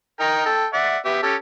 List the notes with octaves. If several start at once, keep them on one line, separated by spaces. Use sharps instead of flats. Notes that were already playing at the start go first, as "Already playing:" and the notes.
D#4 A#4 G5
A4 G5
D5 E5 F#5
B3 G4 E5
C#4 G4 A4